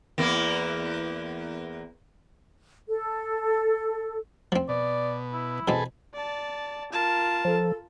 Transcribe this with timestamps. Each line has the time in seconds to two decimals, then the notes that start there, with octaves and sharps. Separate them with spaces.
0.18 E2 A#3 E4
2.89 A4
4.52 F3 C4
4.69 B2 D5
5.33 E4
5.68 B2 E3 C4 G#4 A4 B4
6.14 D5 A5
6.92 F4 A#4 A5
7.45 F3 A4